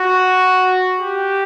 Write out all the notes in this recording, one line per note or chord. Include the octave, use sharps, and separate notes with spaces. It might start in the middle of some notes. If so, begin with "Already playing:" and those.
Already playing: F#4
G4